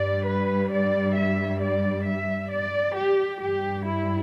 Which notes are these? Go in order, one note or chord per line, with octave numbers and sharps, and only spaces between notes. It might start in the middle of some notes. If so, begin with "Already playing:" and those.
Already playing: G2 G3 D5
B4
D5
E5
D5
E5
D5
G4
G2 G3 G4
E4